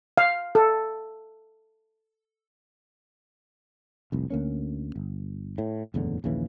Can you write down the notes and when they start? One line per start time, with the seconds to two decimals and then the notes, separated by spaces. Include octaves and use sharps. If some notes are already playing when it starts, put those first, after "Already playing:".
0.18 F5
0.55 A4
4.12 F1 C2
4.30 D2 A#3 C#4
4.96 G1
5.58 A2
5.94 F#1 E2 A2 D3
6.24 A#1 D#2 C#3 E3